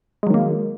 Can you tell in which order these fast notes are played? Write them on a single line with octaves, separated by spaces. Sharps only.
G#3 F#3 D#3 A#3